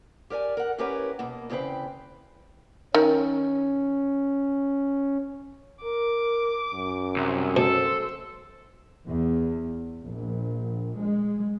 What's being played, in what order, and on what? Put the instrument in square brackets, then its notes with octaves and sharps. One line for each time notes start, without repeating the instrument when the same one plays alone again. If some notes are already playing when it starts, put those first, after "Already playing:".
[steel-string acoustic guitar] G4 A#4 D5 G#5
A#4 F#5
C#4 E4 G4 A#4 B4 C#5
B2 A#3
E2 C#3 C4 G#4 B4 G5
[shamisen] D#3 [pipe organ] C#4
[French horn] A#4 [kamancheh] D6
[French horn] F#2
[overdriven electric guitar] C2
[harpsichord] B2 [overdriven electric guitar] A4 [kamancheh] C5 E6
[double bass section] E2
A#1
G#3